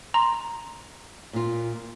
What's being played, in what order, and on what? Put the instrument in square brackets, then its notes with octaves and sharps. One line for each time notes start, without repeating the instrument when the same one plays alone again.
[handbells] A#5 C6
[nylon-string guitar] A#2 F4